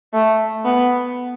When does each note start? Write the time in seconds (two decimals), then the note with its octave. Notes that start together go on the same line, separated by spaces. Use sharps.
0.14 A3
0.65 B3